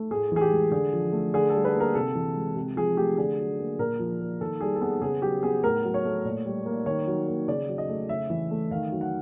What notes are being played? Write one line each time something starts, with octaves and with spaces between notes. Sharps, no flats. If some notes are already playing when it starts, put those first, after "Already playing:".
Already playing: A3
A2 G#4
E3 G#4
G4
G#3
D3 G#4
F3
A3
D3 G#4
G3 A4
B4
A#3
A#4
C3 A4
E3
G#3
C3
F3 G#4
A3 G4
D3 G#4
F#3
A#3
A#2 A#4
F3
A#3
D#3 A4
G3 G#4
A4
B3 G#4
C#3 G#4
F#3 G4
B3 G#4
A2 A#4
F#3
C#5
A3
A#2
G3
A#3
D#3 C#5
F#3
A#3
C#3 D5
F#3
D#5
A3
C#3 E5
E3
A3
D#3 F5
F#3
F#5